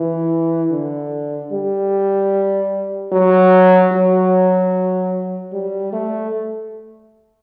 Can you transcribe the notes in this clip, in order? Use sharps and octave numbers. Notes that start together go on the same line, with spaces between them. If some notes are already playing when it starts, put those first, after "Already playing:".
Already playing: E3
D3
G3
F#3
F#3
G3
A3